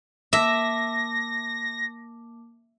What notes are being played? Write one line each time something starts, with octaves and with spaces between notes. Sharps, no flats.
A#3 E5 A5 D6 A#6